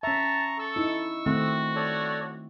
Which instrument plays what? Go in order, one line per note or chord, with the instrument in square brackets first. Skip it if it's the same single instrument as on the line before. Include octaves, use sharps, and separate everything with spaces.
[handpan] C#4 E5 [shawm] A5 [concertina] A#5 C#6
[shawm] A4 [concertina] C#6 E6
[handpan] D#4 E4
[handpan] D#3 A3 C4 [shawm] F#4
[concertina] A4 C#5 D5